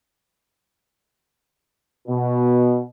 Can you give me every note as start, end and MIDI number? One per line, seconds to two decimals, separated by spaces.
2.08 2.82 47